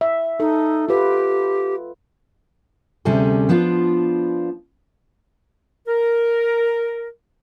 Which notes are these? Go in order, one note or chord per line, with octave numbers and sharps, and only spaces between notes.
E5
D#4 A4
F4 G4 B4
D2 C3 G3 C#4 G#4 A4
F3 B3 D4 F4
A#4